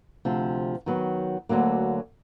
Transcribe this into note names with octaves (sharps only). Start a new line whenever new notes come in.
D2 C3 F3
D#3 F#3 B3
D2 D3 F#3 A#3